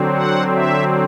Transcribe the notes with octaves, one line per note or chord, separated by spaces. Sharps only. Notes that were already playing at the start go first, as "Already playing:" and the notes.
Already playing: D3 F#3 C4
F#5
E5